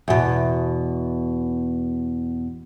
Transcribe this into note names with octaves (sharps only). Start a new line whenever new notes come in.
E2 B2